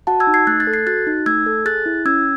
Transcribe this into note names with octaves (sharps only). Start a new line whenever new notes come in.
F#4 F#5 A5
E6 G#6
D#4
G#6 C7
A3 F#6 A6
F#6 A6
A4
G#6 C7
F#4 F#6 A6
D#4
A3 E6 G#6
A4
G#4 F#6 A6
E4
C#4 E6 G#6